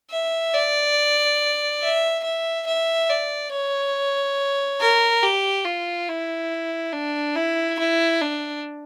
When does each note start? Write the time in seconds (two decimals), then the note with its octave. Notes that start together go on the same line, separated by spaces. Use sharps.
0.11 E5
0.54 D5
1.83 E5
2.24 E5
2.67 E5
3.10 D5
3.52 C#5
4.81 A#4
5.23 G4
5.65 F4
6.08 E4
6.93 D4
7.36 E4
7.79 E4
8.22 D4